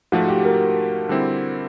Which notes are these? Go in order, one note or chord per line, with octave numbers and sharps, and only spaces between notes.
G#2 F3 A3 F#4
G4
A#4
D3 G3 C4 E4